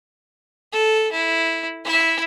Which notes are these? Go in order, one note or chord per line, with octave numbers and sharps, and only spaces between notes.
A4
E4
E4 E5